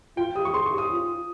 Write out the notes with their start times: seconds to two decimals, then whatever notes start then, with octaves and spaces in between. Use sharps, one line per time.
0.17 F4 G5
0.35 G4 D#6
0.45 C#6
0.54 G#4 C6
0.66 C#6
0.72 G4
0.78 D#6
0.91 F4